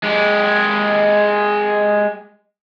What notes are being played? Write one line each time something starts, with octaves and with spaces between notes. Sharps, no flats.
G#3 G4